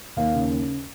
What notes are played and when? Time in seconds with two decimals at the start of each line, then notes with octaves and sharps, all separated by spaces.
0.16 D#2 F5
0.34 C#3